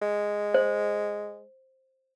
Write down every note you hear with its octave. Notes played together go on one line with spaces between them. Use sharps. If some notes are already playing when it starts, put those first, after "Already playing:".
G#3
C5